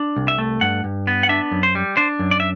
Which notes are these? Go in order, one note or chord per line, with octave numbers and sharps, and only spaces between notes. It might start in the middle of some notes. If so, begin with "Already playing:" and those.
Already playing: D4
C2
E5
A3
G2 F#5
G2
B3
F#5
D4 E5
F#2
C5
G3
D4 C5
F#2
D5
E5